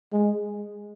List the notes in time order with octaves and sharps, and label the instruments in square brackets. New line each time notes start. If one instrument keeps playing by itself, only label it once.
[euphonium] G#3